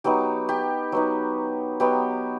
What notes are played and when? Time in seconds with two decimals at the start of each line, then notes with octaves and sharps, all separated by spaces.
0.04 F#3 B3 D#4 G4
0.49 G4
0.92 F#3 B3 D#4
1.80 F#3 B3 D#4 G4